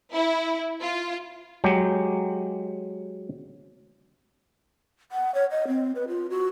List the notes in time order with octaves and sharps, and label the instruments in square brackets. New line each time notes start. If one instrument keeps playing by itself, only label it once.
[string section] E4
F4
[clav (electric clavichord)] F#3 G#3 G4
[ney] F#5
C#5
D#5
C4
B4
F4
F#4